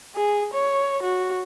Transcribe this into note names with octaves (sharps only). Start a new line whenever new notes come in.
G#4
C#5
F#4